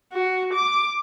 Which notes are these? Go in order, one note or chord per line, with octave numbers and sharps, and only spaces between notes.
F#4
D6